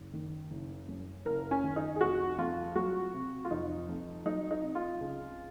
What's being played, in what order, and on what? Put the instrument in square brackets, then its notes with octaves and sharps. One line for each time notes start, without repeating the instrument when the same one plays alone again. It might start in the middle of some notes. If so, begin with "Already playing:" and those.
Already playing: [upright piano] F#1
D#3
F#1
F#2
F#1 A#4
C#4
D#3
D#4
G#4
F1 F#4
F2 F4
F#3 F#4
C3
F4
F1 D#4
F2
F#3 D#4
D#4
C3
F4
C#2